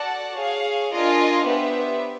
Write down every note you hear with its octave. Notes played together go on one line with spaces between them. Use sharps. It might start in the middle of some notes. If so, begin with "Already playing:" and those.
Already playing: F#4 A4 D5 F#5 A5
G#4 C#5 F5
D4 F4 A#4 D#5 G#5
B3 D4 G4 C5 E5